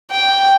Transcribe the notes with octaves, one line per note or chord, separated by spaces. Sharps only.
G5